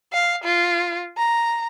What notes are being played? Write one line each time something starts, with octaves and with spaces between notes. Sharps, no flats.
F5
F4
A#5